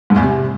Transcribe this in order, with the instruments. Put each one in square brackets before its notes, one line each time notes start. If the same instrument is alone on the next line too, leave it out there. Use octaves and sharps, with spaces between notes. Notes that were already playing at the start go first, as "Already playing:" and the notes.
[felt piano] G#2
E2
C3